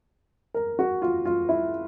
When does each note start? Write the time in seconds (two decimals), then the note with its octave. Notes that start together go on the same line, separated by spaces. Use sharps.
0.54 A#4
0.79 F#4
1.02 F4
1.25 F4
1.49 E4